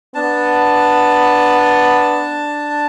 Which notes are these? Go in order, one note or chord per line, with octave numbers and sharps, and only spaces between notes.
B3 D4 A5